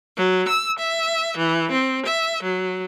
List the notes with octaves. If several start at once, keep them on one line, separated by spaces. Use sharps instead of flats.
F#3
E6
E5
E3
C4
E5
F#3